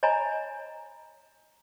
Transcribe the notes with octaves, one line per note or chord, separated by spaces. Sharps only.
C#5 D#5 G#5 A#5 B5